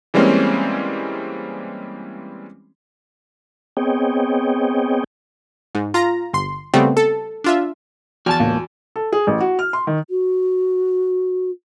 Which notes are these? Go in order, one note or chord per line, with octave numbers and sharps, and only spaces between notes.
E3 G3 G#3 A#3 C4 C#4
B3 C4 G#4 C#5 D#5 G5
G#2
F4 A#5
G1 C6
C#3 G3 A3 B3 C4
A4
D4 F4 E5
E2 F#4 A5 F6 A6
C#2 A2 A#3
A4
G#4
A1
F#4
F6
C6
D#3
F#4